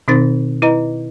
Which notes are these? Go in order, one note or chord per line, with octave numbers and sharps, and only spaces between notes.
B2 D#3 C4 D#4 C5 A6
E4 B4 D#5 A#5